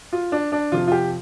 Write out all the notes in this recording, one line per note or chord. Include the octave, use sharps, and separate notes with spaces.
F4
D4
D4
F2 C3 F3 F4
F4
G4